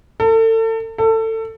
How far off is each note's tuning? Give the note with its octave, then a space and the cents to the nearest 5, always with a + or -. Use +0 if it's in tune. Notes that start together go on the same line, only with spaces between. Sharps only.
A4 +35
A4 +25